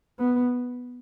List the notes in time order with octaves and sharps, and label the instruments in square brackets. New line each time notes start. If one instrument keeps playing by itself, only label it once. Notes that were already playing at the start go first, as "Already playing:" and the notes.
[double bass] B3